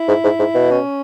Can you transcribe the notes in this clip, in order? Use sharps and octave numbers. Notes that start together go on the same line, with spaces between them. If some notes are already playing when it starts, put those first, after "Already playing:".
Already playing: E4
G#2
G#2
G#2
B2
C#4